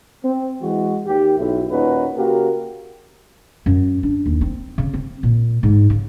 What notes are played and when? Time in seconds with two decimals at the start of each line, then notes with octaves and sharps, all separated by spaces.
0.24 C4
0.61 E3 G#3 F#4
1.07 D#2 G4
1.38 B1 E4
1.70 D#2 A#2 C#4 D#4 F#4 B4
2.16 C#3 A#3 F#4 G4 A#4
3.66 F#2
4.03 D4
4.26 D#2
4.41 C4
4.78 C#3
4.93 C4
5.23 A#2
5.63 G#2
5.90 C#3